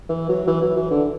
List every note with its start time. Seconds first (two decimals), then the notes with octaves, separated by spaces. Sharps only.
0.10 E3
0.29 F#3
0.48 E3
0.62 F#3
0.77 E3
0.91 D3